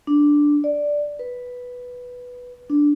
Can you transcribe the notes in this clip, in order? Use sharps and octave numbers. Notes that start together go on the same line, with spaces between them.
D4
D5
B4
D4